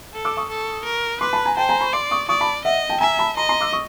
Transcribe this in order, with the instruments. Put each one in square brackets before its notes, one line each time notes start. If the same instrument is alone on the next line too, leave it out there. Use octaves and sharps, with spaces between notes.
[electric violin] A4
[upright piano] D6 E6
C#6 D#6
[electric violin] A4
A#4
[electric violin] B4 [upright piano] C6 D6
[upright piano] A5 B5
G#5 A#5
[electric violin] C5 [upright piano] G5 A5
[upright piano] G#5 A#5
B5 C#6
[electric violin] D5 [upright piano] C6 D6
[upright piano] C#6 D#6
[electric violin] D5 [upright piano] C#6 D#6
[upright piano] A5 B5
[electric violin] D#5 [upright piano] E5 F#5
[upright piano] G5 A5
[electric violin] E5 [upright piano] G#5 A#5
[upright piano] A5 B5
[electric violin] D#5 [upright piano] A#5 C6
[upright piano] A#5 C6
D6 E6
C#6 D#6